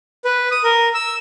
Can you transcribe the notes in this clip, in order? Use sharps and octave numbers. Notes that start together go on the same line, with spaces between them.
B4
D#6
A#4
E6